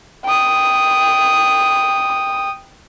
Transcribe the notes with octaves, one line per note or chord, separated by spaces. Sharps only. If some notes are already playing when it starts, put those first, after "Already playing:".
G5 D#6